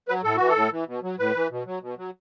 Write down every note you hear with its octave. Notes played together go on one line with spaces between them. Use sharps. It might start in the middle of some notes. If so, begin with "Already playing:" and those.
F#3 B4
A2 A4
E3 F#4
A4
A2
E3
B2
F#3
A2 B4
E3
B2
F#3
B2
F#3